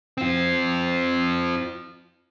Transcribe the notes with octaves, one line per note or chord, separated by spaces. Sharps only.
C4 F4